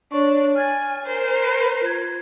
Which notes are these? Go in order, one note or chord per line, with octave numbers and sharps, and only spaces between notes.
D4 C#5 C#6
G#5 F6 G#6 A6
A#4 C5
F4 G#6